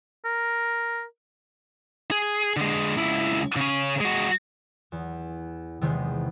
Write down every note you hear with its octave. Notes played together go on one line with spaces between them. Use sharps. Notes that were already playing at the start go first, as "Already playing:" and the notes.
A#4
G#4
D3 G#3
C#2 E4
C#3 C#4
G#3 F#4
E2
E2 C3 D#3 G#3